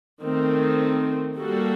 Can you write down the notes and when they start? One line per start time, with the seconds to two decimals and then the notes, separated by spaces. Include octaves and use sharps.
0.22 D#3 A3 C4
1.37 G3 A#3 F#4 A4